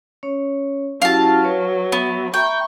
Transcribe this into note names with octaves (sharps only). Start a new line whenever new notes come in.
C#4 C#5
F#3 C#4 E4 G4 F5 A5
B4 C#5
B3 E5
E5 G5 A#5 B5 C#6